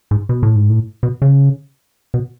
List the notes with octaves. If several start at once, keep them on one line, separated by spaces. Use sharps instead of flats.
G#2
B2
A2
G#2
A2
B2
C#3
B2